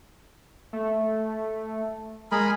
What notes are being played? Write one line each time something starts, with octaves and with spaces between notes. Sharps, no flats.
A3
G#3 G#4 A#4 B5